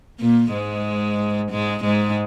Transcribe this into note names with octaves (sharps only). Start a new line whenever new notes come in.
A#2 A#3
G#2 G#3
G#2 G#3
G#2 G#3